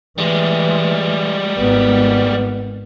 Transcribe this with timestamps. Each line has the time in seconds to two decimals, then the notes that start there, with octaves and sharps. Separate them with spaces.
0.18 E3 G3 G#3
1.59 G#1 B3